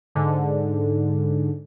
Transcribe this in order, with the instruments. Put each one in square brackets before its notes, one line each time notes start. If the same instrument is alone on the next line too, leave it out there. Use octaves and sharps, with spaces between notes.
[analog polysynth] G#2 D3